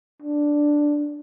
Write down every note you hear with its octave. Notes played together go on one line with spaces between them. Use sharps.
D4